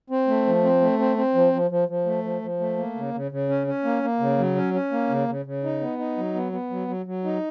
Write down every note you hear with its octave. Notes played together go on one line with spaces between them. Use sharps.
C4
A3
F3
C4
A3
C4
C4
F3
F3
F3
F3
A3
F3
F3
A3
A#3
C#3
C#3
C#3
C#4
C#4
A#3
A#3
C#3
F#3
C#4
C#4
A#3
C#3
C#3
C#3
D#4
B3
D#4
F#3
B3
B3
F#3
F#3
F#3
D#4